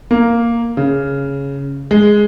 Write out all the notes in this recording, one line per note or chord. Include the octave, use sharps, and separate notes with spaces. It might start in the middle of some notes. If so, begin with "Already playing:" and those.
A#3
C#3
G#3